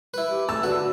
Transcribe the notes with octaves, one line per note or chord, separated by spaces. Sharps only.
E4 B4
G4
A3 A5 E6
D3 F#4 B4